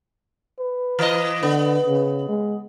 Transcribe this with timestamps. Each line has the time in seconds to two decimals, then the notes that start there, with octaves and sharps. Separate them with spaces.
0.59 B4
0.99 E3 D#5
1.43 D3 B3
1.87 C#3
2.29 G#3